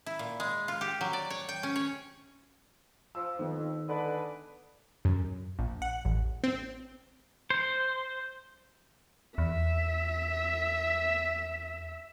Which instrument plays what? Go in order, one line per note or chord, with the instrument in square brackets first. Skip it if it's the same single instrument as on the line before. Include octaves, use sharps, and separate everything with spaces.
[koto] E4
A#2
G#3
F4
G4
F#3
D5
C#5
G5
C#4
C#5
[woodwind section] F3 [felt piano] E6
[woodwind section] F2 [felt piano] D#3 B3
[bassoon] D3 [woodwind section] G#3 D4 B4
[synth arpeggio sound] F#2
A#1
F#5
A1
C4
[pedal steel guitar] C5
[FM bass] E2 [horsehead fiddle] E5